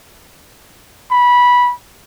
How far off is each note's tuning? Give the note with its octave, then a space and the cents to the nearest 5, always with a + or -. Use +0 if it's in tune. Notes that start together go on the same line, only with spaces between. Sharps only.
B5 -15